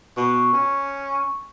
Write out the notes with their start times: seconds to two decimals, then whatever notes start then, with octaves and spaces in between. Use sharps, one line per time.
0.17 B2 C#6
0.54 C#4